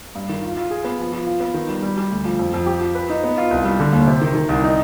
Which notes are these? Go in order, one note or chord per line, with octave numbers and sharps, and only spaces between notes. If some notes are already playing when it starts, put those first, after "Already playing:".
G2
D#3
F4
F4
G#4
B3
F3
F3
F4
B3
D#3
G3
G3
G3
D2
F3
F2
F2
G4
F3
B4
D#4
B3
F4
C2
G3
D3
D#2
C3
D#3
D#3
C2
D#4